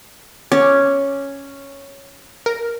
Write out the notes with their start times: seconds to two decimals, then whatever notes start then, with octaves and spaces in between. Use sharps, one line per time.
0.52 C#4 D6
2.46 A#4